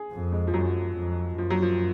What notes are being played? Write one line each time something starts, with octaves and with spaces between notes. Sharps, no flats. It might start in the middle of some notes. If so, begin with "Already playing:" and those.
Already playing: G#4
F2
G#3
F3
F#2 F#3
F2
F#2 F3
F#3
F3